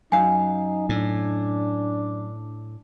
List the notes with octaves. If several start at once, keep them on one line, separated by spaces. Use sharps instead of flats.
F#2 D#4 F5 G#5
A2 D4